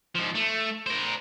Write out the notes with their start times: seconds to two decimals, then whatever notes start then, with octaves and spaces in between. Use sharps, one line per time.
0.15 G#2 F3
0.35 A3
0.86 A#4 C5